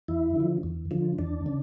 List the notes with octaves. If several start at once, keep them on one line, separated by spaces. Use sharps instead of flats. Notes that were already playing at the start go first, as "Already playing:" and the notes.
E2 E4
D3 F3
E2
D3 F3
E2 D4
C#3